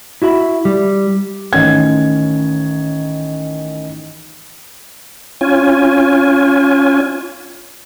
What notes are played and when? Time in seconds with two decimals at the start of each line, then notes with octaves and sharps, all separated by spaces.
0.22 E4 F#4 E5 B5
0.65 G3
1.53 A1 D#3 C#4 G#6
5.41 C#4 F4 G#5